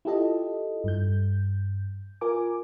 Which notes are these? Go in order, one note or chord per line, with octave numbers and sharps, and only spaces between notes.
E4 F4 G4 A4 D#5
G2 G6
F4 A#4 G#5 D6